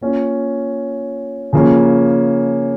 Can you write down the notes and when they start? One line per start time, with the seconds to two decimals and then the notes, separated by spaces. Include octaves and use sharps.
0.01 A#3 C#4 F4
1.53 C#3 F3 A#3 C#4 F4